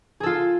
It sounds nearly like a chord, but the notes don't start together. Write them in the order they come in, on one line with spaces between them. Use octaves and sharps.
G#4 A4 F4